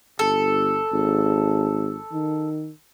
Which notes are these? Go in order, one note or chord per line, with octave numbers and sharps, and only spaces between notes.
G1 A4
G#1
D#3